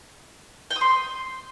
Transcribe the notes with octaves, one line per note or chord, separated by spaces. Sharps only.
G5
D#6
C6